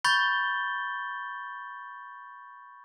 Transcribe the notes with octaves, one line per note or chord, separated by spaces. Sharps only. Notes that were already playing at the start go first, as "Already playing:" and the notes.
B5 C#6 G6 A6 G7